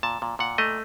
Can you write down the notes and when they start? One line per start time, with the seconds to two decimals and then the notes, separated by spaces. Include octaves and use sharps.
0.03 A#2 A5
0.22 A#2
0.39 A#2 F#5
0.58 A3 D#5